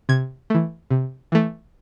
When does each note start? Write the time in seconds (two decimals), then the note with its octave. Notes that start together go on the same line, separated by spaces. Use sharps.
0.09 C3 G#6
0.50 E3 A3
0.90 C3
1.32 E3 A3